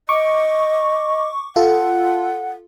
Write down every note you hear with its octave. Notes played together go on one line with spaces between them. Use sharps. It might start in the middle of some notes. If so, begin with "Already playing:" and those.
D#5 C#6 D6
F4 A4 F#5